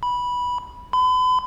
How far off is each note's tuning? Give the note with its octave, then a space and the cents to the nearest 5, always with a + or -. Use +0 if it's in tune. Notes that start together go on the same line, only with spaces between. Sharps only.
B5 -10
B5 +40